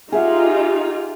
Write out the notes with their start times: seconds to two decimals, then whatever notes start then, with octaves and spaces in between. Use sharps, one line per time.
0.12 D#4 F4 G4 G#4 E5 F#5